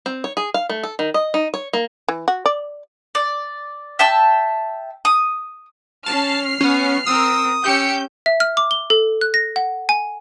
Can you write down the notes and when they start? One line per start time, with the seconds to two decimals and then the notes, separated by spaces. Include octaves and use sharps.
0.06 C4
0.24 C#5
0.37 G#4
0.54 F5
0.69 A3
0.83 A4
0.99 D#3
1.14 D#5
1.34 D#4
1.54 C#5
1.73 A#3
2.08 E3
2.28 F#4
2.46 D5
3.15 D5
3.99 E5 G5 A5 E6
5.05 D#6
6.06 C#4 A5 F6 C7
6.61 B3 C#4
7.06 C4 A#4 D#6 E6
7.64 C#4 G4 E6 G6 C#7
8.26 E5
8.40 F6
8.57 D6
8.71 G7
8.90 A4
9.21 F#6
9.34 A#6
9.56 F#5
9.89 G#5